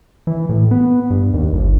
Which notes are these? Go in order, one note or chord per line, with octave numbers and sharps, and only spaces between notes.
E3
A2
B3
G2
D#2
G1